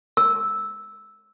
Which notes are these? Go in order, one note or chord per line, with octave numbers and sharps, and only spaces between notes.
E6